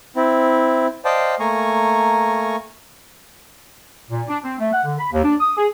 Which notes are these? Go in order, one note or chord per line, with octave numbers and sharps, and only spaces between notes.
C4 E4
C5 D5 D#5 F5 G5 A5
A3 A#3 G#5 A#5 C#6
A#2
D4
C4
A3
F#5
D3
B5
D#2
D4
D#6
G#4